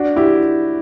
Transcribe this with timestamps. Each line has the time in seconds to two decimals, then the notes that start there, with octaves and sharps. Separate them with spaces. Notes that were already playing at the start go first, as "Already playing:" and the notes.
Already playing: D4 F#4
0.16 E4 G4